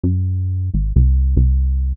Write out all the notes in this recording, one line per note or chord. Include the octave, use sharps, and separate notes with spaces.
F#2
G#1
C2
C2